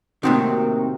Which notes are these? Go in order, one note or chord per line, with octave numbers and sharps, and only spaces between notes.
A2 C3 D#3 A#3 C4 D#4 F#4